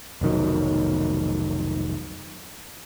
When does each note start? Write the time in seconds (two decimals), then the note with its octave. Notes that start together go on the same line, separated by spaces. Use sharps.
0.21 F1 B1 D#3 F#3